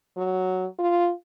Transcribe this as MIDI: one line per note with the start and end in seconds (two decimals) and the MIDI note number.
0.17 0.66 54
0.79 1.11 65